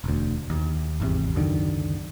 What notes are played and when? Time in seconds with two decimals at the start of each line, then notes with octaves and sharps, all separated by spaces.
0.04 E1 D2
0.50 D#2
1.00 G#1 E2 C3
1.35 C#2 F#2 D3 D#3